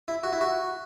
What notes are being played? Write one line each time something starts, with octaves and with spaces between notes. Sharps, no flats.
E4
F#4
E4
F#4